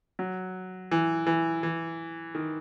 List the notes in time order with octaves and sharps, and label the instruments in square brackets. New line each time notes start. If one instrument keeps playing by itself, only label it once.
[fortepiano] F#3
E3
E3
E3
D#3